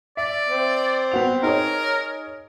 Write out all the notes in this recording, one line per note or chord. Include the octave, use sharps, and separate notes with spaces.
D5 E5
C4
B3 F#4 F7
D#4 G#4 A#4 C#5